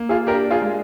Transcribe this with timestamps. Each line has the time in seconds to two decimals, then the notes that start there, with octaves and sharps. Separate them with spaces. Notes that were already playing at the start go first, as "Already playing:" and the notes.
Already playing: A#3
0.09 F4 G#4
0.27 D4 G4 A#4
0.51 F4 G#4
0.62 G#3